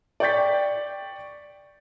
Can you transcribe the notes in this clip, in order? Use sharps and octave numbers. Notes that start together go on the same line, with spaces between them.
D5 G5 C#6 G6 A6 B6